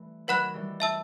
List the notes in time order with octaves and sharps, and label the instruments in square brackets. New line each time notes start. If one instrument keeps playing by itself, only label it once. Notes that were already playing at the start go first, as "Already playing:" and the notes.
Already playing: [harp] E3 G3 A3
[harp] D#3 F#3 [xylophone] B4 F#5 B5 F#6
[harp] E3 G3
[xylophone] E5 A5 E6